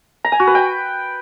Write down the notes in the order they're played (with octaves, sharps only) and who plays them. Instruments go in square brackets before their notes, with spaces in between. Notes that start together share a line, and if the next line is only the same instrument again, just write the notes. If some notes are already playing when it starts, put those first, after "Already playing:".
[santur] A#5
G#5
F#4
B4
G5